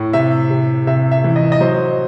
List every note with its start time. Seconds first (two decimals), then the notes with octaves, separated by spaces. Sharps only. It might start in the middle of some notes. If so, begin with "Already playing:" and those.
Already playing: A2
0.13 C3 E5
0.50 C3
0.87 C3 E5
1.11 E5
1.24 E3
1.36 D#5
1.52 D#5
1.61 F#3 C5